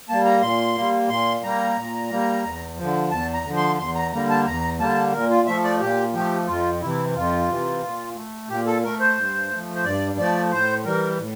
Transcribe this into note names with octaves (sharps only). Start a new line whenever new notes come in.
G3 A#3 A5
A#5
A#2 C6
G3 A#3
A#2 C6
G3 A#3 A#5
A#2
G3 A#3
E2
D3 F3
E2 A5
A#5
D3 F3
C6
E2 C6
A#5
D3 G3 A#3 A#5
A5
E2 A#5
D3 G3 A#3 A5
A#2 A#4
F4
F3 A3 E5
D5
A#2 G4
F3 A3 G4
F2 F4
C3 E3 E4
F2 F4
C3 E3
A#2
A3
A#2 G4
A4
A3 A#4
C5
G2
F3 A3
C5
G2 D5
F3 A3 D5
A2 C5
E3 G3 A#4
A2